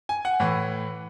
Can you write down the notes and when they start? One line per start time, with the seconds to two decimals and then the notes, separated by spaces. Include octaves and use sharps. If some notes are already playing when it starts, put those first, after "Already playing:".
0.09 G#5
0.25 F#5
0.40 A2 E3